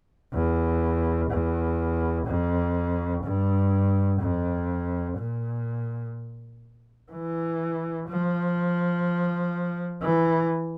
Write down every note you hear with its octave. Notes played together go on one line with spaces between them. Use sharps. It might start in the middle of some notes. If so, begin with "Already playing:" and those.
E2
E2
F2
G2
F2
A#2
E3
F3
E3